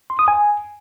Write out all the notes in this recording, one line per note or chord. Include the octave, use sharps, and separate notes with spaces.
C6
D#6
G#5